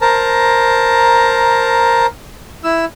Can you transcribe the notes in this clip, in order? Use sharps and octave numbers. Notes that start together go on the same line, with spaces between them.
A#4 C5 A5 A#5
E4 E6